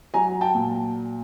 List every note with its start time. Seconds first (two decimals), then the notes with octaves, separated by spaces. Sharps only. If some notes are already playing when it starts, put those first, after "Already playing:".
0.14 F#3 G#5 A#5
0.41 G5 A5
0.54 A#2